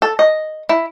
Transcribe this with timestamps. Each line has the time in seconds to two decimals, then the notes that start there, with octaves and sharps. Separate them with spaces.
0.02 A4
0.19 D#5
0.69 E4